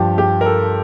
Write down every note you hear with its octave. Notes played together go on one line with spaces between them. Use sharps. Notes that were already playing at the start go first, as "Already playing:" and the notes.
Already playing: G2 F3 G4
G4
A#4
A4